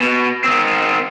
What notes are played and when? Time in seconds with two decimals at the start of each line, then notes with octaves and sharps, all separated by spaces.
0.01 B2
0.44 D#3 C4